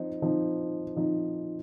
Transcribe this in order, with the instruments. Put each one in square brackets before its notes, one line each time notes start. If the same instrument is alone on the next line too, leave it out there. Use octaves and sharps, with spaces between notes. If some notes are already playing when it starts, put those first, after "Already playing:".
Already playing: [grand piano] F3 C4 D#4
F3 C4 D#4
F3 C4 D#4